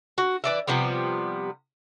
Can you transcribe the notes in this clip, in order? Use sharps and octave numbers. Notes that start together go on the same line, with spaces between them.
F#4
E3 D5 E5
C3 F3 G3 B3